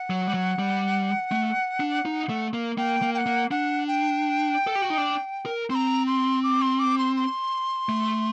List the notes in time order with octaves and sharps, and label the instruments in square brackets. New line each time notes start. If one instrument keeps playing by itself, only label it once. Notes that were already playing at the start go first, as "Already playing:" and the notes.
Already playing: [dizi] F#5
[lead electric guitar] F#3
G3
F#3
G3
A3
D4
D#4
A3
A#3
[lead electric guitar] A#3 [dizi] G5
[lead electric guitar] A#3
[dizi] G5
F#5
[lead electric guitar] A#3
[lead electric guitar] D4 [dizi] F#5
[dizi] G5
[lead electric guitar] A4
G4
F#4
D#4
D4
A#4
[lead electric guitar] C4 [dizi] C6
[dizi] A#5
C6
D6
C6
D6
C6
C6
[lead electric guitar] A3